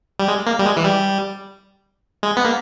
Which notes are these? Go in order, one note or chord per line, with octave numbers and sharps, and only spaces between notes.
G3
G#3
A#3
G3
G#3
E3
G3
G#3
B3
A#3